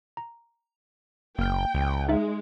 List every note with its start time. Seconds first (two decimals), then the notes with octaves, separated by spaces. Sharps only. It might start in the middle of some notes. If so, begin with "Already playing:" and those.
0.17 A#5
1.39 F#1 A#3 G5 F6
1.75 C#2
2.09 G#3 D#4 E5